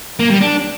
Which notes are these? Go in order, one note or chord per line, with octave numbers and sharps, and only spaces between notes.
A#3
G3
D4